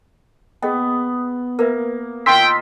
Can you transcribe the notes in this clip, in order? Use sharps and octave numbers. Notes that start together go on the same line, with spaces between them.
B3 G#4 D#5 G5
A#3 A#4 B4 E5
D#3 F4 D#5 G5 C6 E6 B6